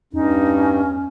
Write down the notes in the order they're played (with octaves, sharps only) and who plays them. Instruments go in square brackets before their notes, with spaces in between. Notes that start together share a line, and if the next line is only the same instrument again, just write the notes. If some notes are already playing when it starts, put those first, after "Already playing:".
[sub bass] E2 [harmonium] G2 [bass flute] C#4 [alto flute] D#4